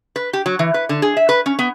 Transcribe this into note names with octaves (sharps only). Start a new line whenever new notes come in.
B4
G4
F#3
E3
B4
D3
G#4
E5
B4
C#4
B3